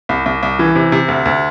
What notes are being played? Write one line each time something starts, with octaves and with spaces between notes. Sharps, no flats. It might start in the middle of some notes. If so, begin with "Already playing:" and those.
C2
C2
C2
E3
C3
C3
D2
D2